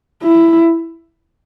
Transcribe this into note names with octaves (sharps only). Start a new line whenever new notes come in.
E4